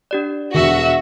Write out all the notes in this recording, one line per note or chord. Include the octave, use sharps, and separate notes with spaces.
D4 G4 D5
E1 F#4 E5